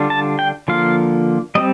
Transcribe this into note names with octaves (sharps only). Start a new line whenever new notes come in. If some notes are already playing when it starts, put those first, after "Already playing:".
Already playing: D3 G3 D4 F4
A5
G5
D3 F3 A#3 F4 F5
G3 C4 D#5